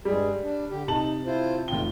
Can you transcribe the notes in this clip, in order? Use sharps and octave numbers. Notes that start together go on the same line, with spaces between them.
G2 G3 G#3 G#4
D4
D3 G4
C3 D#4 A5 F#7
E4 F4 C5
F1 B2 F4 G5 G7